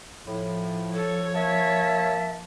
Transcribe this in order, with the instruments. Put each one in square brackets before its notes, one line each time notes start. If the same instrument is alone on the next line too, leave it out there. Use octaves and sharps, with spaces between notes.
[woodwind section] A2 [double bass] F3
[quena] A4 [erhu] C#5
[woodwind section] A#3 A5 [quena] E5